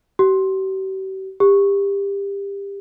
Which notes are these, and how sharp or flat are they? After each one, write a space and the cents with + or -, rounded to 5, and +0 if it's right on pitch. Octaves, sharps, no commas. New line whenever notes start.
G4 -45
G4 +25